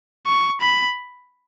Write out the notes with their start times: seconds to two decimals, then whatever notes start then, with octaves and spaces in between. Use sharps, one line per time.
0.26 C#6
0.61 B5